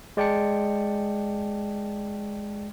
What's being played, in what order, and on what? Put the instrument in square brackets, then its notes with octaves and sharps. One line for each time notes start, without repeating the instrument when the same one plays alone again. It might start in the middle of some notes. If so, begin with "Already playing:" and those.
[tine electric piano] G#3 D5 G5 A5 C#7